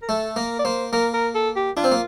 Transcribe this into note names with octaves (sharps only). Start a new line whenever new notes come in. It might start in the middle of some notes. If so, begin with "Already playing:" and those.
A#4
A3 A4
A#3 A#4
D5
A#3 C5
A#3 A#4
A#4
A4
G4
D4 F4
C4
A#3